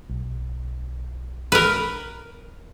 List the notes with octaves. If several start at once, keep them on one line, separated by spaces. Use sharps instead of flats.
B1
A#4 B4